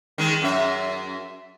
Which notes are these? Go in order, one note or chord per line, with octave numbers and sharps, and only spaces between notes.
D#3 G#3
F#2 E5